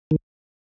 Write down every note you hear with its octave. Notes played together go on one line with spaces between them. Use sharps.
D#3